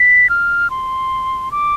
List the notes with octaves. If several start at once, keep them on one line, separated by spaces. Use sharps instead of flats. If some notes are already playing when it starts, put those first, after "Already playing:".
Already playing: B6
F6
C6
D6